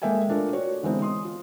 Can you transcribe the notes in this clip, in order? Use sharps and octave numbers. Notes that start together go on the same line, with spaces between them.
G#3 A#3 A4 E5 G5 G#5
A3 D4 F4 A4 A#4
F#4 C#5 D5
D3 E3 G#3 B3 C4 D#4
C6 D#6
F4